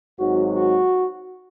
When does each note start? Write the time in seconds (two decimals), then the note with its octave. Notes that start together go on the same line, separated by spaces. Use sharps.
0.19 G#1 G#2 D#3 F#3 F#4
0.55 F#4